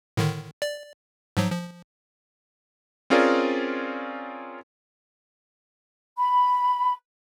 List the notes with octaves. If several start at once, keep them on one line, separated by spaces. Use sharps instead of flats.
A2 D3 D#3
D5
G#2 F3 F#3
F3
C4 C#4 F4 G#4 A#4 D5
B5